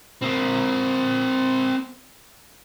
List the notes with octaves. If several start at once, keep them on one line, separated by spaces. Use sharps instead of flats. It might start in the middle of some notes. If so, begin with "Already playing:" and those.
C4 A#4